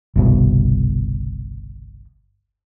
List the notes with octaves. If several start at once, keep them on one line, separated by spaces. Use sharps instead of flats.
G1 C2 B2